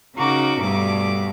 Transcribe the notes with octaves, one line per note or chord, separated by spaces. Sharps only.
C#3 D#4 F#4 A#4 D6
D2 G2 B2 A3 D6